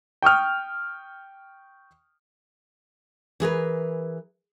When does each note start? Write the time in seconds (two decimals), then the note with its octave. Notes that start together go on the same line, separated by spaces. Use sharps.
0.22 G5 C#6 D#6 F6
3.40 E3 G#4 A#4 B4